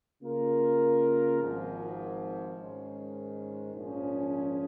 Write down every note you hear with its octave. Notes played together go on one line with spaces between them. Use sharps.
C#3 A#3 F4 A#4
G#1 G#2 F3
G#2 D#3 G#3 C#4
A#1 G#2 F3 C#4 G#4